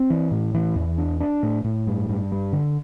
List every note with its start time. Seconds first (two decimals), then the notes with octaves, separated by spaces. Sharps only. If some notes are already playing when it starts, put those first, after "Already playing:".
Already playing: C4
0.10 E3
0.31 A2
0.54 E3
0.76 E2
0.98 D4
1.20 D4
1.43 A2
1.64 A2
1.87 G2
2.10 G2
2.32 G3
2.53 D3